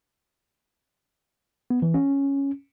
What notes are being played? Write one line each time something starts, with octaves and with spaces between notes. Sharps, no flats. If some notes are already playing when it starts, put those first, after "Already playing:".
B3
E3
C#4